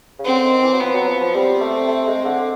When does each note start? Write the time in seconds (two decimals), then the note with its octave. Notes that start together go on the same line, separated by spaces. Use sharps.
0.19 C#3
0.25 D3 C4
0.43 D#3
0.62 E3
0.72 F#3
0.80 F3 B3
0.94 F#3
1.07 F3
1.21 F3
1.33 G3 C4
1.61 A3
1.88 A3
2.07 G#3
2.25 D3